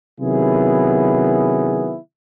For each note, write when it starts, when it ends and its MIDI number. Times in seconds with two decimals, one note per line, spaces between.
0.20 1.97 48
0.20 1.97 51
0.20 1.97 54
0.20 1.97 59
0.20 1.97 64
0.20 1.97 68